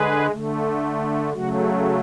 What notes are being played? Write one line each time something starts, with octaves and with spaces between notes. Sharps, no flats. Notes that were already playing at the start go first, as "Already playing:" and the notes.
Already playing: D3 G#3 G#4 B4
D3 A3
C#3 F#3 A3 F#4